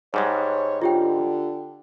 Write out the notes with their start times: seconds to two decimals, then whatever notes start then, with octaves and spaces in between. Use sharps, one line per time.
0.14 G#2 G3 G#3 C#5
0.82 D3 F4 G4 G5